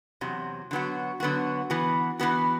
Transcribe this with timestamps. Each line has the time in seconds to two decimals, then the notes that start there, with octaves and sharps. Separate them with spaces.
0.21 E2 C3 F#3
0.71 D3 F#3 B3 F#4
1.20 D3 F#3 B3 F#4
1.70 E3 B3 F#4
2.19 E3 B3 F#4